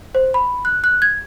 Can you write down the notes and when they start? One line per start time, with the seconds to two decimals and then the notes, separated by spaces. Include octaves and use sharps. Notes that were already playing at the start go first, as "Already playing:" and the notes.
0.15 C5
0.34 B5
0.65 F#6
0.84 F#6
1.02 G#6